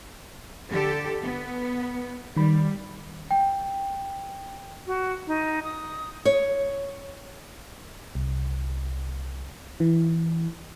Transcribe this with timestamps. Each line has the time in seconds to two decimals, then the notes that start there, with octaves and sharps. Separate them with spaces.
0.70 D3 G4 A4
1.22 B3
2.36 D#3 G3 B5
3.31 G5
4.87 F#4
5.27 D#4
5.64 D#6
6.25 C#5
8.15 C2
9.80 E3